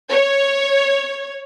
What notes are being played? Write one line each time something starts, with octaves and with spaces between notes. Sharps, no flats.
C#5